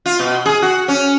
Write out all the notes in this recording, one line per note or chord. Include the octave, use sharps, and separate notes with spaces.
F4
B2
G#4
F#4
C#4